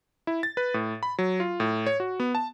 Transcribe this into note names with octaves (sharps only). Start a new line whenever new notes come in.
E4
A6
B4
A2
B5
F#3
F4
A2
C#5
F#4
B3
A5